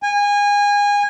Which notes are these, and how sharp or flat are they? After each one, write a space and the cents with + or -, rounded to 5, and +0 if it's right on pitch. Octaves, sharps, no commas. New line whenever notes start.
G#5 -25